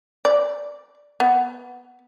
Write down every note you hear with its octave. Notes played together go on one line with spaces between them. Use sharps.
D5
B3